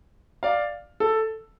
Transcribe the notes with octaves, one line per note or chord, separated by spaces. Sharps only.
D5 F5
A4